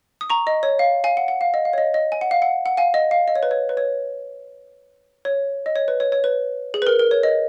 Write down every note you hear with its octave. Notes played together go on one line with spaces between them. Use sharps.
D#6
A#5 C#6
D#5
C#5
F5
F5 G#5
F#5
F#5
F5
D#5
F5
C#5
D#5
D#5
G#5
F#5
F5
F#5
F#5
F5 G#5
D#5
F5
D#5
C#5
B4
C#5
B4
C#5
C#5
D#5
C#5
B4
C#5
C#5
B4
G#4
B4
A#4
A#4
C#5
D#5